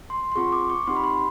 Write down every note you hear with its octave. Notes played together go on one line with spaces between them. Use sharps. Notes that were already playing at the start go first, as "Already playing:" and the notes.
C6
C6
C4 F4 G#4 C#6
D6
C#6
C4 D#4 G4 C6
B5
C6